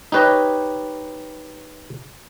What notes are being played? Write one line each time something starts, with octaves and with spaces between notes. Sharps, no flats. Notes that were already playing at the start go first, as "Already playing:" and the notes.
D#4 G4 B4 C#5 D#5